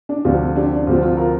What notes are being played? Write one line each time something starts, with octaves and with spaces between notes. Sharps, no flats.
D4
D2 C3 F3 C4 F4
D4 G4
D4
D2 C3 F3 C4 F4
F4
F4 A#4